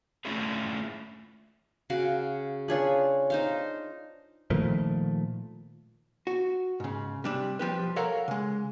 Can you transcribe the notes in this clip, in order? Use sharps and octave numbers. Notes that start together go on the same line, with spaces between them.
A3 C#4 D4 E4 F4 G#4
C#3 F#4 F5
D4 F4 G#4 B4 C#5
D#4 C5 F5
A#2 D#3 F3 A3
F#4
G#2 C#3
C3 G3 D4
B1 F3 G4 B4
A4 A#4 C#5 F5 F#5 A#5
C#3 G#3